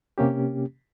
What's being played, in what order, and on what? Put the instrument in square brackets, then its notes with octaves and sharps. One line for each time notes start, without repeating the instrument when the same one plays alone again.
[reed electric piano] C3 A#3 C#4 G4